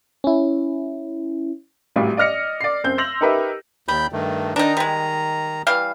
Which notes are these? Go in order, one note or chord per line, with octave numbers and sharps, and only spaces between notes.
C#4 E4
G#1 A2 F#3 G3
D5 D#5 F6 A#6 C#7
D5 C7
F#2 C4 G6
C6 E6 G6 A#6 F7 F#7
D#4 G4 A#4 B4 E5
D#2 G3 B5 G6
G2 D#3 A3
D#3 D4 D#4 A#5
G3 G#3
E3 G3 F5